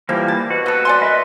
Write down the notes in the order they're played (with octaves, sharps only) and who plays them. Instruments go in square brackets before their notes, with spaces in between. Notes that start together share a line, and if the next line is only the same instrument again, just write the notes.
[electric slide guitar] E3 G3 A#3 [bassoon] F3 [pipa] E5
[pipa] A5
[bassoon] B2 [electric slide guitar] F#4
[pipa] A4 D#5 [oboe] B4
[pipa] D5 G#5 C6
[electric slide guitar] A#4 D#5 E5 [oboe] B4